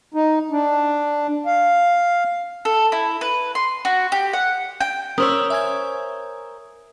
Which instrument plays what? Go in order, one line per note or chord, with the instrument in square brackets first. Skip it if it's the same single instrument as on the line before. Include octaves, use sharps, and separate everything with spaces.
[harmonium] D#4
D4
F5
[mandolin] A4
E4
B4
C6
F#4
G4
F#5
G5
[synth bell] C#4 F#7 [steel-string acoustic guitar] A#4 C5 C#5 [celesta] D#6 E6
[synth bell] E5 G#5 G#6